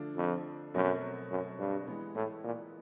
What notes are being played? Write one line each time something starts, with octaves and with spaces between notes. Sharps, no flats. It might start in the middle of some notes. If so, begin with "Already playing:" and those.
Already playing: D3 F3 A3 D4 F4
F2
F#2 B2 F#3 A3 C4
F#2
G2
E3 G#3 B3
A2
A#2